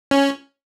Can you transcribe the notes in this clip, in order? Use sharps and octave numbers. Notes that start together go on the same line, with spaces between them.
C#4